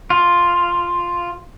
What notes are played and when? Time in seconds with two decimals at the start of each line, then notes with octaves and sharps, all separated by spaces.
0.10 F4